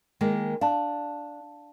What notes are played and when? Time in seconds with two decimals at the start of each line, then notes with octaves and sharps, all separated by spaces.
0.21 D#3 G#3 A#3
0.61 D4 F5 A5